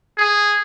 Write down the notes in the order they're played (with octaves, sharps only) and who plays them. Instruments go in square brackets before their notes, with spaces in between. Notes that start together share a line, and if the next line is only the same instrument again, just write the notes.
[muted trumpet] G#4